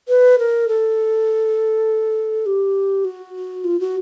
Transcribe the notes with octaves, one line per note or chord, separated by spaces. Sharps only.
B4
A#4
A4
G4
F#4
F4
F#4